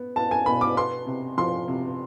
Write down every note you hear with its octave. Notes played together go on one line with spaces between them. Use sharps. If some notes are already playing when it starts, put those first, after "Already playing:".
Already playing: B3
B3 A5
G#5
B2 B5
D6
B3 C6
C3
F3 C6
C3